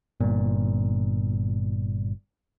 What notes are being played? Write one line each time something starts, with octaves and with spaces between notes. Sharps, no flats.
G1 A#2